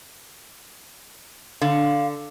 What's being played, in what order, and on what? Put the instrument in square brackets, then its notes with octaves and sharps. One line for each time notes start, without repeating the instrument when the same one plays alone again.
[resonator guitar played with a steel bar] D3 [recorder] F5